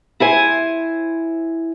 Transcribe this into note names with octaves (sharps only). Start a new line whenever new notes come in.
E4 C5 G#5